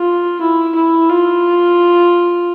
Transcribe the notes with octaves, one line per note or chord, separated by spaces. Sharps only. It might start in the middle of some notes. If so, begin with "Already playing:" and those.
Already playing: F4
E4
E4
F4